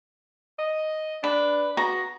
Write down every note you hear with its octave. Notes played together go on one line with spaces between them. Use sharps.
D#5
D4 B4
B3 F#4 A#5